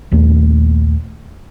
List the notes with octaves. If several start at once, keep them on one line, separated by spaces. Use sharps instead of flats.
A#1 D#2 A3